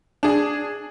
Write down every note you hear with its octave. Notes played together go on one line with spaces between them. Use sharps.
D4 G#4